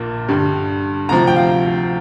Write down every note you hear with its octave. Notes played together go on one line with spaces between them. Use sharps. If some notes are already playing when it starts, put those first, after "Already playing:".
Already playing: A#1 A#2 A#3
G2 D3 G3
D2 C3 F3 A#5
G5
F5